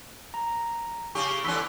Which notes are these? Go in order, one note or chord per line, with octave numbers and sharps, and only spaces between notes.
A#5
C#3 G4 C#6
E2 D3 C#4 B5 E6 B6